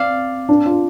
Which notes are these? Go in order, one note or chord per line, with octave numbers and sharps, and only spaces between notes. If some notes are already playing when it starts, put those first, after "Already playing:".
Already playing: C4 D5 F5
D4
F4